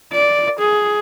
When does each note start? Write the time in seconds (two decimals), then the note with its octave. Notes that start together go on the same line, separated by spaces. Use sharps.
0.13 D5
0.59 G#4